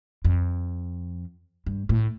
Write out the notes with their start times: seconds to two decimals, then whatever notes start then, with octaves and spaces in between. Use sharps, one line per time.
0.25 F2
1.66 G2
1.89 A2